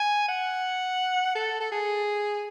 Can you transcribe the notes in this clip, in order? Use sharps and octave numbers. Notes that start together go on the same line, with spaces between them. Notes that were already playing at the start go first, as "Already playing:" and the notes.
Already playing: G#5
F#5
A4
A4
G#4